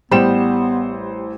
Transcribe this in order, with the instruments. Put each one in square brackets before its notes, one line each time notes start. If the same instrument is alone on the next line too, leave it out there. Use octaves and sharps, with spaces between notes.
[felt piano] A1 C5 E7 [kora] G3 G5 [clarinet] B3